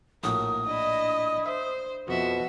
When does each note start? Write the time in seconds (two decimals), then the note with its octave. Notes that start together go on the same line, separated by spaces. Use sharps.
0.24 A#1 A2 F#4 A#4 D#6
0.67 D4 E4 D#5
1.46 C5 E5
2.08 F2 B2 F3 F#4 E5